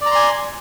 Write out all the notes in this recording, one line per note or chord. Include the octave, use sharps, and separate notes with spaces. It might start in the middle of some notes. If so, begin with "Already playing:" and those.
D5 G#5 A#5 C6